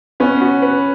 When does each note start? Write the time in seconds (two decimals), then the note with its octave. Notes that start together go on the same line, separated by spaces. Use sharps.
0.20 B3 C#4
0.41 F#4
0.62 B4